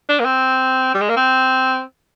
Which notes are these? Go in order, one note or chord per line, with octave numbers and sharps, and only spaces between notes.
D4
A#3
C4
G3
G#3
A#3
C4